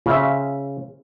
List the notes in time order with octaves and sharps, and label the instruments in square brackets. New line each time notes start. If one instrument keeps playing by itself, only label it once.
[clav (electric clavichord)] C#3 [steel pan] F4 E5